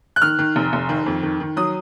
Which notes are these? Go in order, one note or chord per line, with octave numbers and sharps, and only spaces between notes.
F#6
D#3 F6
D#3
F1
F1
D#3
F2
D#3
D#3
F#3 D#6